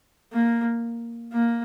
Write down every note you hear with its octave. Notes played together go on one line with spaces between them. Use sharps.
A#3
A#3